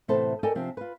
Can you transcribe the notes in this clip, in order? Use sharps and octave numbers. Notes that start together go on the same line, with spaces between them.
A2 C3 E3 B3 A4 C5
A4 A#4 D5 D#5 G5 G#5
C3 F3 C4 D4
F4 B4